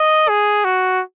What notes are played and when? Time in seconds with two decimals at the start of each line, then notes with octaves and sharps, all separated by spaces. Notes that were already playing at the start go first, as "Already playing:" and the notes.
Already playing: D#5
0.29 G#4
0.65 F#4